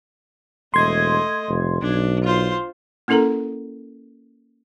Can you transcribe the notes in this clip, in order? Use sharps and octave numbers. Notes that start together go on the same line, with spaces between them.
E1 A3 D#5 C6 G#6
F1
B1 D4
F4 C5
A#3 C#4 E4 A4 A#4 A#5